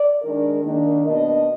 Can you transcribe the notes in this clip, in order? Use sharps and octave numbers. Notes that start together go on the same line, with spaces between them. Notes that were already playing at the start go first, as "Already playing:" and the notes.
Already playing: D5
D#3 G#3 D4 A#4
D#3 A#3 D4
B2 A#3 D4 D#5